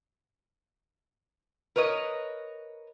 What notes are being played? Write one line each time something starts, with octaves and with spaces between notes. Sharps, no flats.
A#4 B4 C#5 D#5